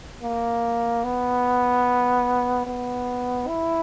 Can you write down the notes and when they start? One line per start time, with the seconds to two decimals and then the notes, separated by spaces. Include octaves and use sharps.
0.23 A#3
1.04 B3
2.67 B3
3.48 E4